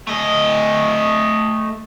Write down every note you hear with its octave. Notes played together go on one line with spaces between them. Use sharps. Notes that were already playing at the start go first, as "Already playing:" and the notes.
A3 D#5